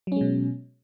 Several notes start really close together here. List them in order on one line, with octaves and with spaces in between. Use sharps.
F#3 C#4 G#3 B2